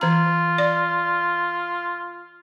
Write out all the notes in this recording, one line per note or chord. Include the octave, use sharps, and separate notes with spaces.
E3 F4 A#5
D5